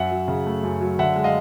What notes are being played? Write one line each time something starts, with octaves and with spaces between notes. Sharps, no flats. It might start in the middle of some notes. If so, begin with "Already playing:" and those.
Already playing: F#2 E5 F#5
F#3
C#3
A3
F#2
F#3
D3 E5 F#5
G#3
D#5 F5